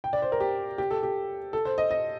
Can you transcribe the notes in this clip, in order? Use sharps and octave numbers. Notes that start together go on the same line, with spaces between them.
G5
D5
C5
A#4
G4
G4
A4
G4
A4
C5
D#5
D#5